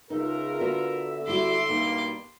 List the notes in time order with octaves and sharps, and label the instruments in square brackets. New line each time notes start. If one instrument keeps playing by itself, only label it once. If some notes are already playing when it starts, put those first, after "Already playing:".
[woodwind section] C#2 C#3 E5 [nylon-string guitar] D#4 [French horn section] F4 A#4
[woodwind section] D3 E5 [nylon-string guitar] B3 F#4
[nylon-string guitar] G3 E4 F#4 [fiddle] C6 D6
[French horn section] G2 G3 A#3 [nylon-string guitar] B2 D#4